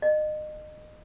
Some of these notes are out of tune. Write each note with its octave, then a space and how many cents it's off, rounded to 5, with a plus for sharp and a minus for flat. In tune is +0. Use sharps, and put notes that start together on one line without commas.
D#5 -30